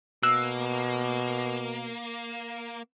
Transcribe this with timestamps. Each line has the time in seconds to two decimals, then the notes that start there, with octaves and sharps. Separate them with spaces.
0.23 B2 A#3 E6 F#6